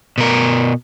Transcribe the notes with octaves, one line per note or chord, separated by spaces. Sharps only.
B2 A#4